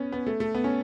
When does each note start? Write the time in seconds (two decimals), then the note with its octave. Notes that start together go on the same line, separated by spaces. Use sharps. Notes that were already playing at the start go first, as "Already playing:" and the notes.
Already playing: B3 C#4
0.12 B3
0.27 A3
0.40 A3
0.55 B3
0.64 C#4